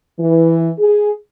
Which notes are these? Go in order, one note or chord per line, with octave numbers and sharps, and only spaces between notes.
E3
G#4